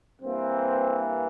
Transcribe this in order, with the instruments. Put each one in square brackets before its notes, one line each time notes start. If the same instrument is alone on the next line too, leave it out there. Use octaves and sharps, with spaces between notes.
[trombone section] G2 E3 A#3 C4